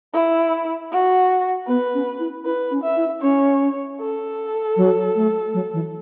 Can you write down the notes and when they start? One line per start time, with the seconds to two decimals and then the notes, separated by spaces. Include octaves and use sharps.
0.13 E4
0.91 F#4
1.67 B3 B4
1.94 C#4
2.20 E4
2.45 E4 B4
2.71 C#4
2.83 E5
2.97 E4
3.22 C#4 C#5
4.00 A4
4.77 F#3
5.15 A3
5.54 F#3
5.73 E3